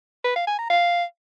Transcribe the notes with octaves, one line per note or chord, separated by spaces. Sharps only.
B4
F5
G#5
A#5
F5